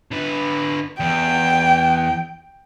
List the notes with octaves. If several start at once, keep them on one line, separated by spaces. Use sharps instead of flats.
D3 B4
E2 G5